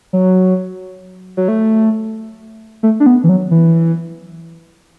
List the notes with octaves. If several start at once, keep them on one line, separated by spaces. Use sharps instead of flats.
F#3
F#3
A3
A3
D4
B3
E3
F#3
E3